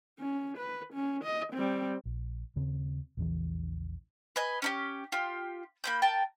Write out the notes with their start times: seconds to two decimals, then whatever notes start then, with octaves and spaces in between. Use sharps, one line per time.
0.19 C#4
0.58 B4
0.94 C#4
1.24 D#5
1.53 G3 C4
2.06 A#1
2.56 D#2 C#3 C4
3.17 A#1 E2 C#3 E3
4.36 B4 D#5 G#5
4.62 C#4 D#4 G4
5.12 F4 G4
5.84 A#3 B5 G6
6.02 A#4 G5 A5